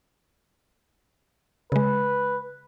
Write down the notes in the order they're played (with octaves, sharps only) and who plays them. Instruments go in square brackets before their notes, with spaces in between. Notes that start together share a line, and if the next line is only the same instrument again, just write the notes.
[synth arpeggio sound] C#3 G#3 [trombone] B4